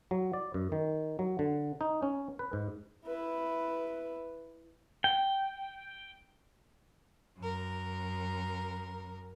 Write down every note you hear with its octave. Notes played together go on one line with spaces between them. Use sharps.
F#3
D5
F#2
D#3
F#3
D3
D#4
C#4
B4
G#2
E4 B4
G5
F#2 A#4